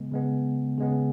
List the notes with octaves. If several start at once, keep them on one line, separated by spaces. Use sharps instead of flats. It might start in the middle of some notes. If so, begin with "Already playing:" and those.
Already playing: C#3 G#3 B3
C#3 G#3 B3
C#3 G#3 B3